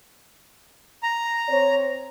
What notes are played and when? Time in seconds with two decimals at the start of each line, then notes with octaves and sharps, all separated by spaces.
1.03 A#5
1.49 C4 C5 C#5